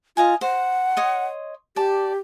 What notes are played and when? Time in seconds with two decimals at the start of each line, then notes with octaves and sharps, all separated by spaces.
0.17 F4 D#5 F5 G#5
0.41 C5 F#5
0.97 C#5 D#5 C6
1.76 G4 D5 A5